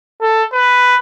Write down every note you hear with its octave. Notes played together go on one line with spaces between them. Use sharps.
A4
B4